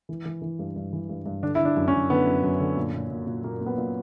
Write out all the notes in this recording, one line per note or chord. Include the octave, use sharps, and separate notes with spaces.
E3
E3
E3
G2
G2
E3
G2
G2
D3 D4
D3 E4
D4
F#2
C#4
F#2
D3 B3
F#2
F#2
D3
A#2
A#2
A#2
A#2
A#2 A#3
A#2
B3
A#2